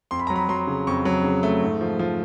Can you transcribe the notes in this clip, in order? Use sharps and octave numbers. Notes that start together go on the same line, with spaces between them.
F2 C6
B5
A#5
F#3
B5
F#3 C6
C#3
F2 C#6
F#3
C#3
A3
G#2
F3
F3